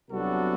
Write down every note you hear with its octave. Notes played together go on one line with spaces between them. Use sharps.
C2 C3 F#3 B3 D4 F#4 A4